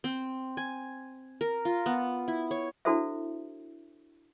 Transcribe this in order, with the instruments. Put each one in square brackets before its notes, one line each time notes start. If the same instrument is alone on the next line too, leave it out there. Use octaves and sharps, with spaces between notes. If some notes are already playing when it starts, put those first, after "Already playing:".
[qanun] C4
G#5
A#4
F4
B3
E4
C#5
[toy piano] D4 E4 F#4 A4 C5 E5